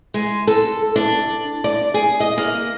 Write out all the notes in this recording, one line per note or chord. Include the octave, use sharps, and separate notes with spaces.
G#3
A4
D4
D5
G#4
D#5
A#3